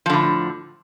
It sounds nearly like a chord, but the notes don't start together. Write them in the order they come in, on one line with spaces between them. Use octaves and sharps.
F3 D3 A2